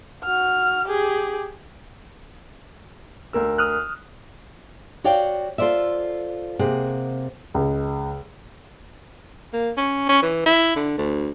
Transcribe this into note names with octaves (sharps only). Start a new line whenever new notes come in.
F#4 F6
G4 G#4
D2 A#4 E6
D#6 F6 F#6
F#4 C#5 D5 F5 G5
F4 A4 C5 D5 E5
C3 A#3 G#4 F#5
C#2
A#3
C#4
C#4
E3
E4
D3
D2